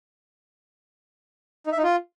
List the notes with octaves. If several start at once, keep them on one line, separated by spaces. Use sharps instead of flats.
D#4
E5
D#4
F4